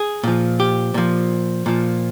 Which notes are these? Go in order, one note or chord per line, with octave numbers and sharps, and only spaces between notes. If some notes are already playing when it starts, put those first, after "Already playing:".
Already playing: G#4
A#2 F3
G4
A#2 F3
A#2 F3